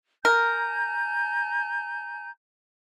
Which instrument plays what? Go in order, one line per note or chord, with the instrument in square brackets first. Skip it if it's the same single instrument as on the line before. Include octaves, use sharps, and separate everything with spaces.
[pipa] A#4 [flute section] G#5 A#5 G6